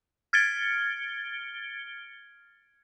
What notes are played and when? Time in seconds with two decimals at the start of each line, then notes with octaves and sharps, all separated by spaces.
0.33 F6 G#6 A6 C#7 D7 G7